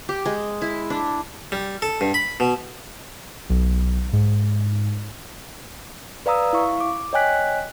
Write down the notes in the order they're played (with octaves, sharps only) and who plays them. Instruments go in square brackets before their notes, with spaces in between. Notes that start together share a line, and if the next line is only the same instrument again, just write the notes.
[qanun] G4
G#3
E4
D4
[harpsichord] G3
A4
G2
B5
B2
[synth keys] B1
G#2
[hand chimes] B4 D5 F5 A#5 D#6 E6
E4 F5 C#6
D6
C#5 D#5 G5 G#5 F#6 B6